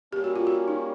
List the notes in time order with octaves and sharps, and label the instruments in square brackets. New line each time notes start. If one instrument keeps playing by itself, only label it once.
[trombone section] G3 A#3 C#4 [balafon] G4
[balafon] F#4
F4
F#4
D#4